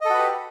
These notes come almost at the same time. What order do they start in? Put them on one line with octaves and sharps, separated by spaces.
D#5 A4 F#4 B4 G4